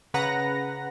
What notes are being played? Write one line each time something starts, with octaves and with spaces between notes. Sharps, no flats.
C#3 B4 F#5 A#5 A#6